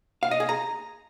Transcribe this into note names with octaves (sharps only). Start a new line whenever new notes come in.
F5
D#5
G#4
A#5